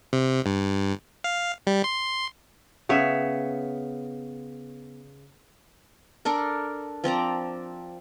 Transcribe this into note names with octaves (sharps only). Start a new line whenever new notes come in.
C3
G2
F5
G3
C6
C#3 B3 C#5 E5
D4 A4 A#4
F3 C4 D5 A#5